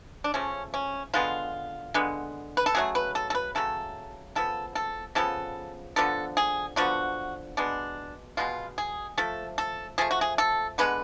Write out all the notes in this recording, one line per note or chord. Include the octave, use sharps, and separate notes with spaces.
D4
C#3 F3 A3 C#4
C#4
D3 G#3 B3 F4
D3 G#3 B3
B4
A4
C#3 F#3 A3 G#4
B4
A4
A4
B4
C#3 F#3 A3 A4
C#3 F3 B3 A4
A4
C#3 F3 B3 A4
D3 F3 B3 A4
G#4
D3 F3 B3 F#4
B2 G#3 B3 D4
B2 G#3 B3 F4
G#4
F3 A3 A4
A4
F3 A3 G#4
F#4
G#4
A4
D3 G#3 B3 B4